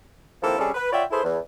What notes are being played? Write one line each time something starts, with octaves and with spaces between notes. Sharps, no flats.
D#2 F3 A#3 C4 E4 A4
C3 G3 C#4 D4 G#4 A4
B4
F4 C#5 D5 E5 F#5 G5
E4 G#4 A4 B4 C5
E2